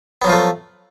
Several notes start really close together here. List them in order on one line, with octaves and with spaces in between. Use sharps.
B3 F#3 F3 F4 A3